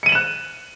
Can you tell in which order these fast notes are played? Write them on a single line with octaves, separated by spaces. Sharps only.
C#7 D#7 F#7 E7 F#6